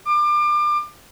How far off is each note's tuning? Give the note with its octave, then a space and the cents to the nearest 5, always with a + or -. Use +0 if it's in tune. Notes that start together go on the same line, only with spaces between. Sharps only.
D6 +30